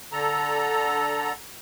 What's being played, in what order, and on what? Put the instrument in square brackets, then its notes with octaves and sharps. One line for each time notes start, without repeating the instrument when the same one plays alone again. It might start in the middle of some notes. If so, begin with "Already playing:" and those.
[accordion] D3 A4 A#5